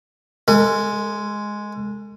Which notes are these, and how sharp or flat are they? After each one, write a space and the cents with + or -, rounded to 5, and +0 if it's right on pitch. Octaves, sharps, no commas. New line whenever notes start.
G#3 +0 A4 +45